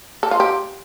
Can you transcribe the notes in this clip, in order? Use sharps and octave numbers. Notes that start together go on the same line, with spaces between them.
A4
F4
G4